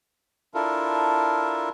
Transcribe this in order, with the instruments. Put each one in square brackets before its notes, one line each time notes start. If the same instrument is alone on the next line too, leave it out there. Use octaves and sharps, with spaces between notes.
[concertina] D4 E4 F4 A4 A#4